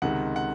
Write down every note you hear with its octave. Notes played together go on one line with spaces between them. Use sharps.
C#2 C3 D#3 F#5
F#5